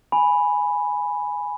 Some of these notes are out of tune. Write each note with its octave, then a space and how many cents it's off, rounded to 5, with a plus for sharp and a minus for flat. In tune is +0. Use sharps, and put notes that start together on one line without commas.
G#5 +0 B5 +0